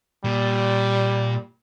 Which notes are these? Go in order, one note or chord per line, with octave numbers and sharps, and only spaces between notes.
A#2 G3